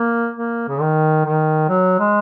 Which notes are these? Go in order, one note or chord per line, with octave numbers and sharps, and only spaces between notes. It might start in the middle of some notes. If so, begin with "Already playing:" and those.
Already playing: A#3
A#3
C#3
D#3
D#3
F#3
G#3